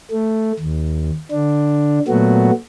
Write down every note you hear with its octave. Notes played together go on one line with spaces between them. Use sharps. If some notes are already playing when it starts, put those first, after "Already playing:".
A3
D#2
D3 D4
A#2 F#3 A3 B3 F#4